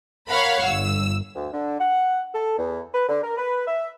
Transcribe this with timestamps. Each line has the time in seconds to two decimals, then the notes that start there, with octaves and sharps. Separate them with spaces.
0.29 A#4 C#5 F5 F#5 B5
0.64 G1 E6
1.36 D2
1.52 D3
1.80 F#5
2.34 A4
2.58 E2
2.94 B4
3.09 D3
3.23 A#4
3.37 B4
3.68 E5